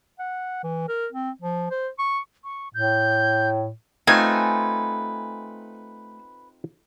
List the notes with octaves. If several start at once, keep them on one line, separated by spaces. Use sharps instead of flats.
F#5
E3
A#4
C4
F3
C5
C#6
C#6
A2 G6
A3 C4 D#4 F4 B4 G#5